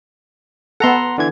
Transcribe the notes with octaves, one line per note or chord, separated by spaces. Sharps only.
B3 A4 F#5 A#5 C6
D3 E3 G#6